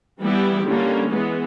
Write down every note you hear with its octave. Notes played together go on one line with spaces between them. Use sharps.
E3 G3 B3 E4 G4
D3 G3 A#3 C#4
E3 G#3 B3